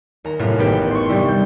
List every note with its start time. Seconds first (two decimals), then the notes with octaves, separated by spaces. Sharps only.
0.24 D#2 A#5
0.39 F#2 A2 C3 A#3 B3
0.58 A1 D#2 B3 G4 B4 G5
0.91 C6 C#6
1.09 G2 C3 G3 C4 E4
1.28 G6